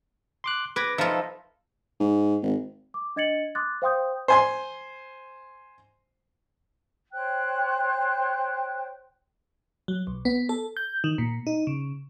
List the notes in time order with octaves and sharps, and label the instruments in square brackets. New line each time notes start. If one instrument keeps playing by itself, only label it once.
[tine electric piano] C6 D6 F#6
[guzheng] B4 [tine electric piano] D6 G#6 A#6
[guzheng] F3 F4 [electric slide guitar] D#4 A4 [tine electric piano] E5
[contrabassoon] G#2
G#1
[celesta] D6
D4 D#5 G#6 A6 C#7 F#7
C6 D6 D#6 F#6 A6
C5 F5 G5 C6 D#6 G6
[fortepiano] C5 G#5 C6
[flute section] C5 C#5 G5 F#6
[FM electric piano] F#3
B1
B3
A4
G6
D#3
A#2
D#4
C#3